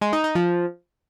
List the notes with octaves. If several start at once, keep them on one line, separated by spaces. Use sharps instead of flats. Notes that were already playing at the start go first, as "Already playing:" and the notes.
G#3
D#4
D#4
F3